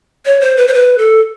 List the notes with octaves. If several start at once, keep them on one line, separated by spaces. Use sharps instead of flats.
C#5
C5
B4
C5
B4
A4